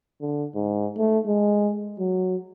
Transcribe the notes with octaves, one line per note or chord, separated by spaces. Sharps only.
D3
G#2
A3
G#3
F#3